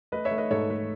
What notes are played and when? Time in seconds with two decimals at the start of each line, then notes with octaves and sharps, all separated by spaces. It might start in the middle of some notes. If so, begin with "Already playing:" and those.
0.12 A3 B4 D#5
0.25 C#5 E5
0.31 A3
0.38 B4 D#5
0.50 G#2 A4 C#5
0.70 A3